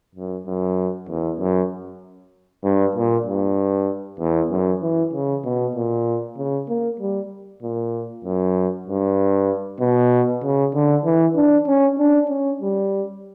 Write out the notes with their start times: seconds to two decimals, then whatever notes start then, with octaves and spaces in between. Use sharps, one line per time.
0.15 F#2
0.46 F#2
1.08 E2
1.39 F#2
2.64 G2
2.95 A#2
3.26 G2
4.20 E2
4.50 F#2
4.82 E3
5.13 C#3
5.45 B2
5.75 A#2
6.37 C#3
6.69 A#3
7.00 G3
7.62 A#2
8.24 F#2
8.88 G2
9.80 B2
10.43 C#3
10.75 D3
11.05 E3
11.36 D4
11.67 C#4
11.99 D4
12.29 C#4
12.62 G3